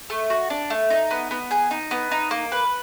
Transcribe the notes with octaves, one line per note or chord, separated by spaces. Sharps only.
A3
F#4
D4
A3
D#4
B3
B3
G#4
D#4
B3
D#4
A#3
B4